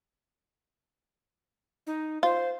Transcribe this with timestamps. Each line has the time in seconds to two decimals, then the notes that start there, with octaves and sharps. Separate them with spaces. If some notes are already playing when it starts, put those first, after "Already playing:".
1.87 D#4
2.23 F4 C5